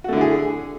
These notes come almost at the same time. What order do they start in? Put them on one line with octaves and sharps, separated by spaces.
F#4 A3 D3 E4 G#4